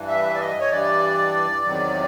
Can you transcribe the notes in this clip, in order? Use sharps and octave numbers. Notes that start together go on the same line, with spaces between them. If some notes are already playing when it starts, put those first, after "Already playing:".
Already playing: G2 E3
E5
D5
D#5
C#5
G2 E3 D5
E2 C3 D#3 F#3